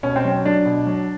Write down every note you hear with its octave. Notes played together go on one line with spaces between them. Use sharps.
B2 C#4
C4
F#3 C#4
F#3 D4
B2
F#3